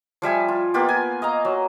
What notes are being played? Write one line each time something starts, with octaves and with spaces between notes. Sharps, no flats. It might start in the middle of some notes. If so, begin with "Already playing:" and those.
F3 G3 E5 G#5
F4
A#3 B3 F4 G4
G#5
D#5 F5 A#5
F#3